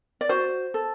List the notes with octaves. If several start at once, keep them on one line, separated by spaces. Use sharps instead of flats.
D5
F#4 C5
A4